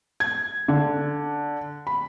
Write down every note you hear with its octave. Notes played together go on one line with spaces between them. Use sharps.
G#6
D3
B5